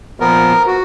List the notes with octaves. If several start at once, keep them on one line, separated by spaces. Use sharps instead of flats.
A#2 F3 B3 A#4
F#4